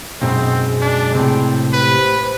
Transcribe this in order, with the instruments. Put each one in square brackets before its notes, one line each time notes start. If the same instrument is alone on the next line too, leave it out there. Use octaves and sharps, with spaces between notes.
[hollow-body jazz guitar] B1 F#2 B2 [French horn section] G#3 [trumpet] C4
[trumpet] D4
[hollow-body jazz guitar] A2 C3 [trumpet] C4
[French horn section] G4 C5 [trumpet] B4